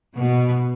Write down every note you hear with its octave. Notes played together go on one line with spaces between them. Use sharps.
B2